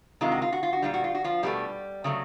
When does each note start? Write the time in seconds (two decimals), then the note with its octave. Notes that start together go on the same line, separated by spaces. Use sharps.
0.21 C3 D#3 G#3 F4
0.32 F#4
0.42 F4
0.52 F#4
0.63 F4
0.73 F#4
0.82 A#2 G3 F4
0.94 F#4
1.04 F4
1.15 F#4
1.24 F3 F4
1.43 B2 F#3 G3 A3 G4
2.04 C#3 F#3 A3